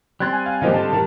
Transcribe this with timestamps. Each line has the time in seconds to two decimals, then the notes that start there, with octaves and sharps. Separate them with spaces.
0.20 G3 C4 F#6 G#6 A6
0.32 G#5
0.46 F5
0.62 D#3 F3 A#3 G4 D#5 F5
0.73 D3 A5
0.93 D#3 G3